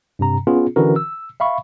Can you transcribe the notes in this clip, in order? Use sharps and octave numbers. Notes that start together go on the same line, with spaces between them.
G2 C3 A#5
B3 C#4 F4 G#4
D3 E3 C#4 F#4 A#4
E6
E5 F5 B5 C#6